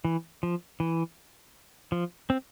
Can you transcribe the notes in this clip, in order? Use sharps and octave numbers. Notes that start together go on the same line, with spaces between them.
E3
F3
E3
F3
C4